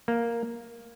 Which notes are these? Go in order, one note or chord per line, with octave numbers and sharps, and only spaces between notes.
A#3